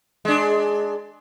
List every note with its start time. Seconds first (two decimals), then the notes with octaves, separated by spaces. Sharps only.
0.25 G#3 D4